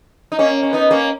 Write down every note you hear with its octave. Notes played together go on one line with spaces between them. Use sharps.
D#4
A#3 C#4
C#4
B3 D#4
A#3 C#4